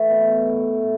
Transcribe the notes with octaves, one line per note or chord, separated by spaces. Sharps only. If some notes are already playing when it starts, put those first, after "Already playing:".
Already playing: E3 A3
B2 B3
A2 E3
A2